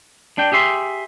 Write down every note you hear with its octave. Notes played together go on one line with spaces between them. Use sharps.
D4 G5
G4 G#4 E5 C6